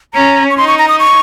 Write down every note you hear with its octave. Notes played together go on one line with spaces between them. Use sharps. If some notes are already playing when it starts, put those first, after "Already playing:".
C#4 A#5
C#6
D#4 C6
C#6
A#5
D#6
C#6